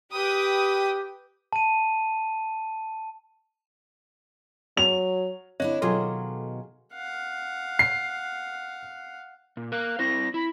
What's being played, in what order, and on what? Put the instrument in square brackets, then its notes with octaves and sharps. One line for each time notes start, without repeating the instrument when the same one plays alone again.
[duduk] G4 [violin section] B4 G5 D#6
[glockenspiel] A5 D#7
[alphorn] F#3 [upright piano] F7
[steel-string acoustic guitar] D3 D4 E4 [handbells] C4 C#5 D#5
[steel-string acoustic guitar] B2 D#3 F#3 [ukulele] F4 G#4 [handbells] A4
[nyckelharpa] F5 F#5
[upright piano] C7
[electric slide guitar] A#2
[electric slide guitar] A#4 F5 [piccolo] F#6
[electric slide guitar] C4 E4 C5 [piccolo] A#6
[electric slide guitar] E4 [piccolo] B5